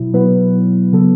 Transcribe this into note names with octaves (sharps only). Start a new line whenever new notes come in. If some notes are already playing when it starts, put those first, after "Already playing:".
Already playing: B2 F#3 E4
B2 F#3 B3 E4 B4
C#3 F#3 B3 A4